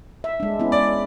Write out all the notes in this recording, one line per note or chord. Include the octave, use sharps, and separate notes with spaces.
E5
G#3 D4
B3 C#4 E4
D5